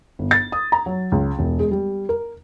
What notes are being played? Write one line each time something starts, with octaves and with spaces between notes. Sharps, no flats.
G1
A6
D#6
A#5
F#3
C#2
E1
G#3
G3
A#4